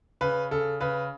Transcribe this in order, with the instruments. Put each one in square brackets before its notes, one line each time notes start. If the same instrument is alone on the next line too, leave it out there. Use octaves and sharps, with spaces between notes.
[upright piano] C#3 B4
C#3 A4
C#3 B4